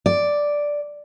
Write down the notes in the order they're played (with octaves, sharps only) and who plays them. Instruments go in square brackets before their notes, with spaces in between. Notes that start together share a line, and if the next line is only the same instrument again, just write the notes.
[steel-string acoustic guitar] D5